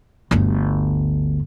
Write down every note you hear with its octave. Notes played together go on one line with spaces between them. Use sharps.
G1 D2